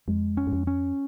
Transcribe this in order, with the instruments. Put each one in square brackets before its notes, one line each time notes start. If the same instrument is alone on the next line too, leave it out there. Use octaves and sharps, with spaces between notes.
[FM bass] F2 [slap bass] G#3
[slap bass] C#4
[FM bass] G2
F2
[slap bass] C#4